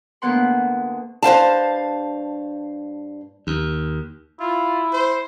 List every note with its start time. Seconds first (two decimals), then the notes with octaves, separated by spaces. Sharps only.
0.22 D2 A2 A#3 B3 F#5 C6
1.23 G2 C5 F5 A5
3.47 D#2
4.40 E4 F4
4.93 C5